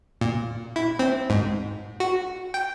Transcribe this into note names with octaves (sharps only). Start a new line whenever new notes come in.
A#2
E4
C4
G#2
F#4
G5